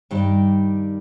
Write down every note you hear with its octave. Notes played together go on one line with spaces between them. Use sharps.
G2 D#3 G3